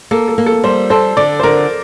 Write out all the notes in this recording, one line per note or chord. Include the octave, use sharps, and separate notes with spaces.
A#3 A4
A4
A#3
A4
G3 C5
A4 C5
D3 D5
C5
D3 A#4